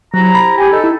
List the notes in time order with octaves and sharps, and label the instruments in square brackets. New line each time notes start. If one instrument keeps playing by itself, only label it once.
[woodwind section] C3 E4 A#5 [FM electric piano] F#3
[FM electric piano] B5
[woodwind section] G4 G#5
D#4 A4
[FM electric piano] E4